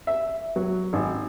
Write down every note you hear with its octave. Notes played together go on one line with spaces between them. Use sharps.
E5
F#3
G#1